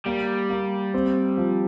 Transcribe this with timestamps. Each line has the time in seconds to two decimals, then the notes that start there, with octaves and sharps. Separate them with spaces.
0.06 G3 A#3
0.50 A#3
0.94 C4
1.37 F3